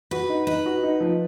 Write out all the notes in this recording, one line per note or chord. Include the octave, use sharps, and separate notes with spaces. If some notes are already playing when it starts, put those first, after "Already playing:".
F#4 B4
D#4
D#4 B4
F#4
D#4
F3